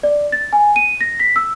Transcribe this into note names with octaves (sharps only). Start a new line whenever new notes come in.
D5
A6
G#5
D#7
A#6
B6
E6